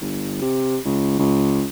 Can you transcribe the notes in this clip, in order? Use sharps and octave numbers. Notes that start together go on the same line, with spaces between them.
G1
C3
C#2
C#2